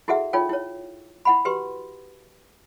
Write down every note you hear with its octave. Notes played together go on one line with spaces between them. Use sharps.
E4 F#4 G#4 A4 E5 F#5
D#4 F4 A4 C#5 G5
E4 C#5
E4 F#5 B5
F#4 G4 B4 C6